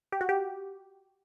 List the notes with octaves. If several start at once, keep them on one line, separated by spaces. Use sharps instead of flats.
G4
F#4
G4